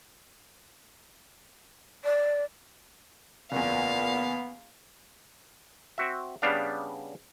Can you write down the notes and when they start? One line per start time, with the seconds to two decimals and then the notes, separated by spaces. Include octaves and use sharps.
2.04 D5
3.52 F#1 E2 A#2 B3 F5
5.98 C4 F#4 E5
6.42 C#3 G3 B3 D4 F5